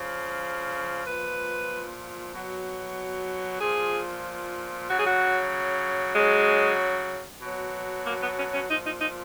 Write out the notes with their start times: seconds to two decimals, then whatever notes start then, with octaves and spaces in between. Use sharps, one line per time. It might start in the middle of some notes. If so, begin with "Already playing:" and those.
Already playing: C#3 F3
1.07 A#2 F3 B4
2.33 B2 F#3
3.60 A#2 F3 G#4
4.88 C#3 F#3 F#4
4.96 G#4
5.06 F#4
6.15 C#3 F#3 G#3
7.42 B2 F#3
8.06 A#3
8.21 B3
8.38 C#4
8.54 C#4
8.69 A#2 F3 D#4
8.85 D#4
9.01 D#4